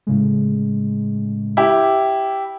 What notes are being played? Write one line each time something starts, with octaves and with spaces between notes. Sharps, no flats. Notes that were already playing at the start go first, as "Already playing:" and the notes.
A2 C#3 G#3
E4 G4